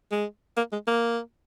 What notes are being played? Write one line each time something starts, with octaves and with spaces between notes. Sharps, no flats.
G#3
A#3
G#3
A#3